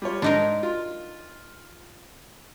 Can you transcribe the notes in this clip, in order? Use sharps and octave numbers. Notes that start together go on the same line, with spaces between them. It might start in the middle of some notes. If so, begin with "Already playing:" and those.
G3 F4 C#5
G#2 D4 D#4 A#4
F4